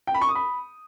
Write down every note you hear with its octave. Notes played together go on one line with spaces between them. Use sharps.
G5
B5
C#6
D#6
B5